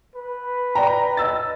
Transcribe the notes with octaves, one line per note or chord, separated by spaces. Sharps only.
B4
D5 G5 A#5
D#5 E6 A6